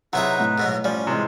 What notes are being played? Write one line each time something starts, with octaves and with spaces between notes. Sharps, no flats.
C3 F#3 D#4 E4 G#4 B4 F#5
A2
G#2 B2 F#3
F3 G3 C#4
C3 E3 G#3